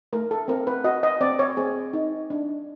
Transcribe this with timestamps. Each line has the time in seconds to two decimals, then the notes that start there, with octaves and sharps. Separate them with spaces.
0.13 A3 A#4
0.31 A4
0.48 C4 A#4
0.67 B4
0.84 F#4 D#5
1.03 D#5
1.21 C4 D5
1.39 C#5
1.57 C4 G#4
1.93 D#4
2.30 D4